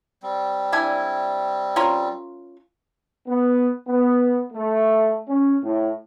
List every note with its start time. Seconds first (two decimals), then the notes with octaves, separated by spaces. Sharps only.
0.23 G3 C4
0.72 D4 E4 G#5
1.76 C#4 F4 A#4
3.27 B3
3.88 B3
4.53 A3
5.28 C#4
5.63 A2